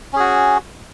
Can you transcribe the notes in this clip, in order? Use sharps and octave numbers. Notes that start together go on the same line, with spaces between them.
C#4 F#4 G#4